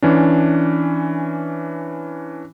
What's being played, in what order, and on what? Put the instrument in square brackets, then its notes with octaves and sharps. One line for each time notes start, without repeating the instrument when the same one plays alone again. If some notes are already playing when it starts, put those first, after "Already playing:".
[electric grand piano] E3 C#4 D4